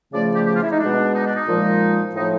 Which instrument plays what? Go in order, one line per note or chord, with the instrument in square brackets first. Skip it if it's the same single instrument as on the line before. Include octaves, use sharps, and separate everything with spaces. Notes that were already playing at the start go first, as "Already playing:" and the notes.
[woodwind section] C#3 F3 A3 D5
G4
G4
F4
E4
D#4
B2 G#3 D4
D#4
D4
D#4
A#2 F3 G#3
A2 F3 A3 D#4